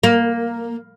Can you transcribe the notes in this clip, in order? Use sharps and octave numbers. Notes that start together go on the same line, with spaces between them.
A#3